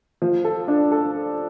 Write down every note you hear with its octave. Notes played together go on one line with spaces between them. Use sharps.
F3
A4
D4
A4